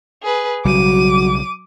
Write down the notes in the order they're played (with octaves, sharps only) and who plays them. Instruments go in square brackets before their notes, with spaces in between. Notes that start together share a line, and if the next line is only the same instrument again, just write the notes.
[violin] G#4 B4
[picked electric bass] B1 C#3 G3 [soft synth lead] F#3 [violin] D6 D#7